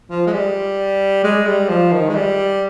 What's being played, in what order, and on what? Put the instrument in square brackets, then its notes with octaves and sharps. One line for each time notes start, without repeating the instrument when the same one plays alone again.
[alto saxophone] F3
G#3
G3
G#3
G3
F3
D#3
G#3
G3